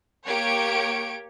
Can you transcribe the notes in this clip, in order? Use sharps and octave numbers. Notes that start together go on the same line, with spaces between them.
A#3 G4 C#5 G#6 D7